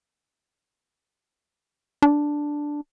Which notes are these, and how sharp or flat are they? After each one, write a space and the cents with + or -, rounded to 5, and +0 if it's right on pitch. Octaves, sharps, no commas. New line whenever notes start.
D4 +0